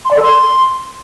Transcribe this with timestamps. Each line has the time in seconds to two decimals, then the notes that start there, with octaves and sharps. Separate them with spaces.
0.05 C6
0.10 D5
0.16 A4
0.22 C6